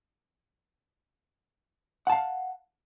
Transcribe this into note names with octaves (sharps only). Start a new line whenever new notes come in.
F5 F#5 A5